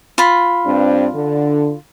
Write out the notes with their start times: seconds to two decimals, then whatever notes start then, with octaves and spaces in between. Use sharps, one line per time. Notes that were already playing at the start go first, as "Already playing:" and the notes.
0.18 F4 B5
0.66 G2 C4 D4
1.14 D3